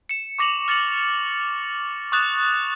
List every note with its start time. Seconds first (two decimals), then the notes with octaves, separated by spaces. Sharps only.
0.09 C#7 E7
0.39 C#6 D6 A#6 F7 F#7
0.68 F6 A6 C#7 F#7
2.12 C#6 D#6 F#6 A6 E7 F7